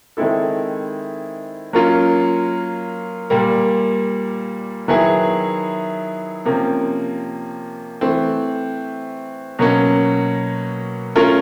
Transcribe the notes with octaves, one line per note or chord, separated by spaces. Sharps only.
D#3 G#3 C4 E4 A4
F#3 A#3 C#4 F4
A#2 G3 A#3
D#3 F#3 B3 E4 G#4
C3 F3 A#3 C#4
E3 A3 C4
B2 F#3 A#3 C#4
A3 C#4 F4 A#4